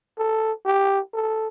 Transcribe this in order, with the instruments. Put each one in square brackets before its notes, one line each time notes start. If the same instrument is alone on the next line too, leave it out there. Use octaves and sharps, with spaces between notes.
[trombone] A4
G4
A4